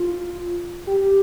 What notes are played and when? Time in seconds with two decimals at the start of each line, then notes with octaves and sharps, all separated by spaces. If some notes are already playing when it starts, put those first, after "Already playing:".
Already playing: F4
0.87 G4